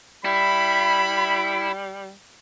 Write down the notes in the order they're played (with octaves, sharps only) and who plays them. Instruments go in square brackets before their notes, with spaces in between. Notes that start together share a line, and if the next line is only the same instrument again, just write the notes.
[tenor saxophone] G3 [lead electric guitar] E4 [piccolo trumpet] B5